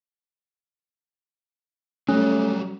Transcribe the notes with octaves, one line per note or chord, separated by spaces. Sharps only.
F#3 G3 A3 C#4